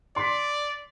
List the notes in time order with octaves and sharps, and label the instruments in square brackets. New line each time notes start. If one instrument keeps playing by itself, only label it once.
[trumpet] D5 [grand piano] C6 B6